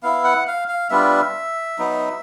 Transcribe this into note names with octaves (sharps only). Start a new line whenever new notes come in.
B3 E4 F5
F#5
F5
F5
G3 B3 D4 F4 E5
F#3 B3 D#4